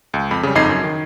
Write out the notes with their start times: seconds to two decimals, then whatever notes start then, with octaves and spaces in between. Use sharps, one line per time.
0.14 C#2
0.31 F2 B5
0.43 C#3 G3
0.55 G1 F2 D#4 D#5 G#6 C7
0.69 F#2
0.84 D#3